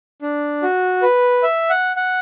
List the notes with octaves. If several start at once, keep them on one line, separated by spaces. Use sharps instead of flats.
D4
F#4
B4
E5
F#5
F#5